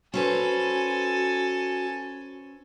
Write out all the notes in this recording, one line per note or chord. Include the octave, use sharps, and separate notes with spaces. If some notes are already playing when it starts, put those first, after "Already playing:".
C#4 F#4 A4 B4 C5 G#5